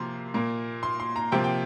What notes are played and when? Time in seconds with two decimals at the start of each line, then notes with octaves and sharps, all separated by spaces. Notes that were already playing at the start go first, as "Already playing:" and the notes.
Already playing: C3 F3 A#3 A#5 C6
0.34 A#2 A#3
0.83 C6
1.00 C6
1.16 A#5
1.32 C3 F3 A#3 G5
1.44 G5